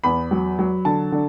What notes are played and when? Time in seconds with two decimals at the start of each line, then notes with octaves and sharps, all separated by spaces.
0.04 E2 B5
0.31 F#3
0.59 F#3
0.85 D3 A5
1.12 D3